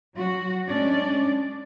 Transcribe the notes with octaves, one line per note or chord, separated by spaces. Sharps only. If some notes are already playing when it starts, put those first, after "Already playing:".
F#3 F#4
G#3 C#4 D4 D5